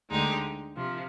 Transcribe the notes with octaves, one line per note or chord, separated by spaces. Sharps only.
D2 D3 G#3 D#4 G4
C3 F3